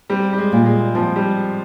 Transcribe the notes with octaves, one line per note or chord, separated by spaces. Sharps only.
G3 C4
G3
G#3
A#2
G#3
F3 C4
G3